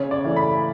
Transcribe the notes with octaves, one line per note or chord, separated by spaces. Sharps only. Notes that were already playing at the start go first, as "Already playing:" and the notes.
Already playing: C#3 C#5
D5
E3 A3
B5